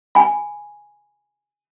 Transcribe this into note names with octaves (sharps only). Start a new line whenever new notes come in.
G#5 B5